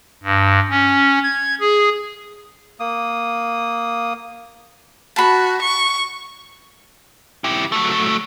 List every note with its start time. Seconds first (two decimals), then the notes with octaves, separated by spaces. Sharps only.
0.23 G2
0.70 C#4
1.23 G#6
1.60 G#4
2.80 A#3 D#6
5.16 F#4 A5 B5
5.62 C#6
7.44 E4 G4
7.72 F#3 A3